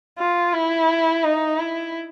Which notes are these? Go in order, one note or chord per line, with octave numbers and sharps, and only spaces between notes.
F4
E4
D#4
E4